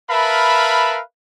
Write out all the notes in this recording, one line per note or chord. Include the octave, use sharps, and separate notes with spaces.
A#4 B4 E5 F5 A5 B5